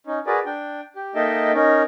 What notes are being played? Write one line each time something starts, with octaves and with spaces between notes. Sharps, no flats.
C#4 D#4
F#4 G#4 A#4 B4 D5
D4 G5
G4
A#3 D#4 A4 D#5 E5 G5
C#4 D#4 A#4